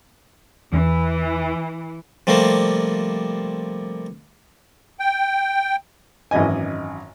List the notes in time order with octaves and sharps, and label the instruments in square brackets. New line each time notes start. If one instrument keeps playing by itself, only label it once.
[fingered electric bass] E2 [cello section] E3
[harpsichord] C3 F3 G3 A3 A#3 C4
[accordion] G5
[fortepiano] G#1 F#2 E3 D#5 G#5